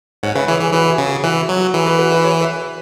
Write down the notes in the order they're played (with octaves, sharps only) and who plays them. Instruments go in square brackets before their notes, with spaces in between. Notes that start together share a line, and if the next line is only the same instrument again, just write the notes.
[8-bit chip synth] G#2 [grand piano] C#5 F#5
[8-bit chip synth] C#3 [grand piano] B4 E5
[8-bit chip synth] E3 [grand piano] G#4 C#5
[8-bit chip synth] E3 [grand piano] G#4
[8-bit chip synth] E3 [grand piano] F#4 B4
[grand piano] G#4
[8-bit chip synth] C#3
[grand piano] G#4
[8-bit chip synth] E3 [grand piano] F#4 B4
[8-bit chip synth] F#3
[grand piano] F#4
[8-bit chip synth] E3 [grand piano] G#4
[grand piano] F#4 B4
F#4 B4
F#4 B4
G#4 C#5
B4 E5